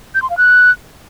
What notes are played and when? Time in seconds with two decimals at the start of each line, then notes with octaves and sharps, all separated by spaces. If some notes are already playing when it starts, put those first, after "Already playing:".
0.15 G6
0.22 C6
0.30 F5
0.37 F#6